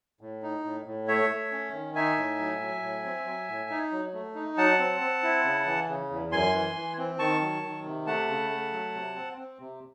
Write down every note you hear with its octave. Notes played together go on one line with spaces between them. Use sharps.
A2
D#4
A2
A2
A3 C#5 E5
A3
C#4
D#3
D#4 E5 G#5
A2
F#3
F#3
A2
C4
F#3
A2
D#4
F#3
A3
D#4
F#3 F#5 A5
C4
C4
E4
C#3
E3
C#3
E2
F#2 G#5 C6
E3
E3
C4
D#3 A5 C#6
F#3
D#3
C3
A3 F#5 A5
C#3
A3
F#3
C3
C4
C4
C3